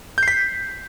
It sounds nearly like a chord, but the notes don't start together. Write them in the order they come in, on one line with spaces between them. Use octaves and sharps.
G6 C7 B6